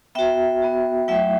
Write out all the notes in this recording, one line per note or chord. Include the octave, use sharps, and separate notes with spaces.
B3 F#4 E5 G5
B3 F#4
F#3 A3 E4 E5 G5